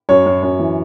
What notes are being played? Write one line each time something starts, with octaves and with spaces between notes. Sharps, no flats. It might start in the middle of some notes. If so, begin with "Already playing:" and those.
F#2 C#5
F#2
F#2
E3